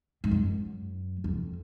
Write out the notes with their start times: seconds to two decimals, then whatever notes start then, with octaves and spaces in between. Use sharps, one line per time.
0.24 G#2
0.31 F#2
1.24 F2